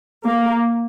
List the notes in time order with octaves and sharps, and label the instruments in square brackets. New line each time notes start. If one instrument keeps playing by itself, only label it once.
[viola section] A#3